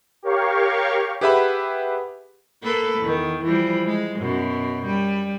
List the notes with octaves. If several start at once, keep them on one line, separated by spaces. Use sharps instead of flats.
G4 A#4 C#5 F5 C#6
G4 G#4 B4 E5 F#5 B5
A#3 A4 B4
E2 D#3
E3 F3 G3
G#3
F#2 B2
G3